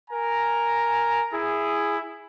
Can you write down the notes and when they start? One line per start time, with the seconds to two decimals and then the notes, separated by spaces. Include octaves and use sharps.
0.11 A#4 G#5 A#5
1.33 E4 G#4